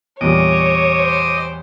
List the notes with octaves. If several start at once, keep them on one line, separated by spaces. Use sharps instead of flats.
E2 A#2 G3 C#5 D#5 D6
C5